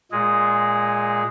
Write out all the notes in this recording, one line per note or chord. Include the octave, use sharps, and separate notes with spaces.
A#2 G#3 G#4